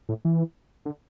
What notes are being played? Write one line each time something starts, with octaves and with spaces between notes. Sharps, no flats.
A2
E3
D3